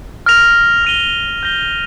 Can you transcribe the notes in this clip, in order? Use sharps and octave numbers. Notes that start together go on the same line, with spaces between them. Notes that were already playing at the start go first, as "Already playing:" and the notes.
F6 A#6 F7
F6 D#7 G7
G6 A#6 G7